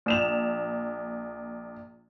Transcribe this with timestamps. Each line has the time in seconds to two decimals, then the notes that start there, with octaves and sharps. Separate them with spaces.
0.06 A#1 E7 F7